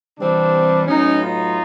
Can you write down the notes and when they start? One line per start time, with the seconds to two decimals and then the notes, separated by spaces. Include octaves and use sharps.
0.18 C3 E3 G3 C4 D4
0.87 A2 F#3 B3 C#4 D#4
1.22 D#4 F4